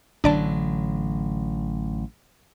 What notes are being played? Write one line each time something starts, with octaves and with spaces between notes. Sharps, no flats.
A1 D3 F#3 D4 D5 A5